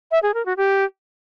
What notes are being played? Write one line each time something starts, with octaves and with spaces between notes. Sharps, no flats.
E5
G#4
A#4
F#4
G4